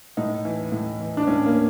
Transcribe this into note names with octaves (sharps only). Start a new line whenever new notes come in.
A2 D#4
E3
A2
E3
D4
A2 C#4
A#3